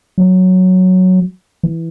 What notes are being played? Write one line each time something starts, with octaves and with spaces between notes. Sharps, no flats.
F#3
E3